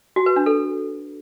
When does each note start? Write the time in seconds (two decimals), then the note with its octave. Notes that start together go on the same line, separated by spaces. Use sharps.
0.16 F#4
0.26 B4
0.36 D4
0.46 A4